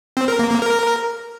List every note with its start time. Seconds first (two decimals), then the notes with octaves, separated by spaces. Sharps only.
0.17 C4
0.28 A#4
0.39 A#3
0.51 A#3
0.62 A#4